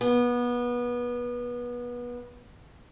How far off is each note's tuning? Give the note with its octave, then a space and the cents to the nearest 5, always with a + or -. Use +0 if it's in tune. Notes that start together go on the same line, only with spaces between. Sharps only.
B3 -25